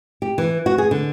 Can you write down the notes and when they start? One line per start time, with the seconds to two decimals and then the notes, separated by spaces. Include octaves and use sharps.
0.22 G4
0.38 E3
0.66 F#4
0.78 G#4
0.91 D3